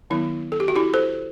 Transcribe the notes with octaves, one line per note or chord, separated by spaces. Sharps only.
D#3 F#3 B3 E4
A4
G4
F#4
E4 G4
A4 C5